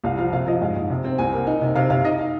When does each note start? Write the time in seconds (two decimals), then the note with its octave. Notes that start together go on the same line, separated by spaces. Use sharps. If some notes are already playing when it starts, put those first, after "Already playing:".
0.04 C2 F5
0.18 F3 F5
0.33 C3 F5
0.47 F3 D#5
0.61 G#2 F5
0.76 G#2
0.90 C3
1.05 C4
1.18 C2 G#5
1.33 A#3
1.47 D#4
1.61 C3
1.76 C3 F5
1.90 C3 F5
2.05 D#4 D#5
2.19 F5